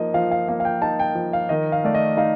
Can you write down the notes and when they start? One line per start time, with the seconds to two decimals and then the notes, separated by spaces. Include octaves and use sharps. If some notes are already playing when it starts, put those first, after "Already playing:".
Already playing: F3 A#3 D#4 D#5
0.14 F3 F5
0.31 F5
0.48 A#3 F5
0.60 F5
0.65 G5
0.82 D#4 A5
1.00 G5
1.15 F3
1.33 F5
1.49 D#3 D#5
1.72 F5
1.84 A3 D5
1.94 D#5
2.17 D#4 F5